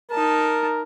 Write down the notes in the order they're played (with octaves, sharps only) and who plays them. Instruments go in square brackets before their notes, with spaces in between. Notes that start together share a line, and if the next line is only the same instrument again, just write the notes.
[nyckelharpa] D#4 A5 [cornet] A#4